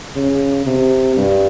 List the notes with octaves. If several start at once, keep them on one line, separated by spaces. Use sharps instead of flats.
C#3
C3
G2